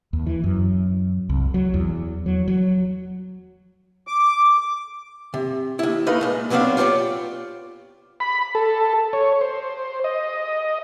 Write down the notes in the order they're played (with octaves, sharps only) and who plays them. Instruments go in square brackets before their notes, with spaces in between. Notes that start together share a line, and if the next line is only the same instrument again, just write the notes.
[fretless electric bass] D#2
E3
F#2
C2
F#3
E2
F#3
F#3
[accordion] D6
[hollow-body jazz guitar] C3
D#2 E4
A3 D#4 A#4 B4 F5
A#2 G#3
A#2 F#3 B3 C4 D4 F5
F4 G4 A#4 C#5 D5
[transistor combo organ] B5
A4
C#5
C5
D#5